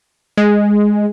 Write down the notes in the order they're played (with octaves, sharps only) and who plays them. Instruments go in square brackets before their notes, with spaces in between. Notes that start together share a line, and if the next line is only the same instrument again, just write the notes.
[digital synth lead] G#3